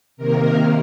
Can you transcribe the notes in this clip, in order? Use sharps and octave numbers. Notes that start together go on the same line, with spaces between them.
C3 D#3 A#3 A#4